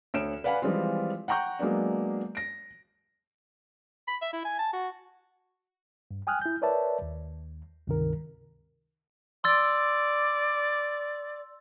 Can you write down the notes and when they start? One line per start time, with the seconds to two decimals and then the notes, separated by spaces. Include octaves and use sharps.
0.14 D2 C#5 D7 E7
0.44 B4 D5 F5 F#5 G#5 B5
0.62 E3 F3 G3 G#3 C4 F4
1.28 F#5 G5 A#5 C#6 G6
1.59 F#3 G#3 A#3 B3 D4
2.35 A#6 D7
4.08 B5
4.22 E5
4.33 E4
4.45 G#5
4.59 A5
4.73 F#4
6.11 G2
6.27 G5 G#5 D#6 F6 F#6
6.42 E4 G6
6.62 A#4 B4 C#5 D5 E5 A5
7.02 D#2
7.87 C#2 G2 C3 D#3 A#4
9.44 D5 C6 E6 A6